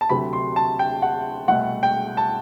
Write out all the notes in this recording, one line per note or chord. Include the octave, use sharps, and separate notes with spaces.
A5
D2 C3 F#3 A3 C4 B5
C6
A5
G5
F#5
C2 B2 A3 F#5
G5
A5